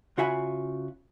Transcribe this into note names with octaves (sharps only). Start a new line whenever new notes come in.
C#3 F4 F#4 E5 G#5 B5